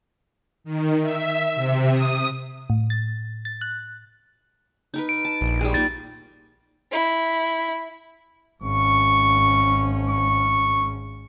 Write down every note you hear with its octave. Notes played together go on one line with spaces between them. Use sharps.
D#3
E5
C3
D#6
A2
A6
A6
F#6
D#4 A#4 B4
D7
A5
A#1
G3 G#3 G#4
A#3 D#4 F4 A6
E4
G#1 C#4 C#6
C#6